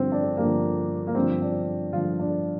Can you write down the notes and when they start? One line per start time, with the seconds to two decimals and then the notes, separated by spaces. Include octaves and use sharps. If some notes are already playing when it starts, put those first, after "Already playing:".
Already playing: G2 D3 F3 C4
0.12 D4
0.37 G2 D3 F3 A#3
1.07 A#3
1.15 G2 D3 F3 C4
1.42 D4
1.93 G2 D3 F3 F4
2.19 D4